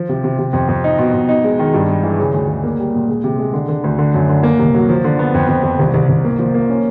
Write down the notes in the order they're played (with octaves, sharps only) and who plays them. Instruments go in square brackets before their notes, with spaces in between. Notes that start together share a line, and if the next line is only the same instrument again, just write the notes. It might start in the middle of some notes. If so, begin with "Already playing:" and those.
Already playing: [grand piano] F3
C3
C3
C3
F2
F2
D#4
B2
B2
D#4
G#3
D#3
G2
G#3
E3
C#3
D2
C#3
A#3
G3
A#2
G#3
C3
G#3
D3
D3
D2
D3
F#2
D3
A#3
C2
F#3
F3
D3
B3
F2
F2
F2
C2
C2
C2
A#3
F3
A#3
C#4